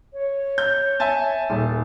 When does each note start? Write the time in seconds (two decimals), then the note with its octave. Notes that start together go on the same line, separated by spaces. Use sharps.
0.13 C#5
0.58 G6
1.00 E5 G#5 A5
1.50 D#1 A4